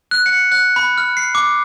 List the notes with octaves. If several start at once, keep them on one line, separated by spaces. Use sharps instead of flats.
F#6
C#7
F#6
B5
F6
C7
D6